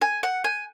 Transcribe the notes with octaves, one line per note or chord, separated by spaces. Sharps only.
G#5
F#5
G#5